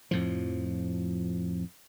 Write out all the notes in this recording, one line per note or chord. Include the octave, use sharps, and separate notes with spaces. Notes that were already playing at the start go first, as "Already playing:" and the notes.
F2 A2 F3